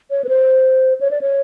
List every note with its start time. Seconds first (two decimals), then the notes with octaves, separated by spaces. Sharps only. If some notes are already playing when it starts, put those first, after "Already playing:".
0.10 C#5
0.24 B4
0.29 C5
1.01 C#5
1.11 D5
1.21 C#5